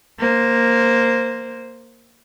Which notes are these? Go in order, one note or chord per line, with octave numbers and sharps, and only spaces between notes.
A#3 C5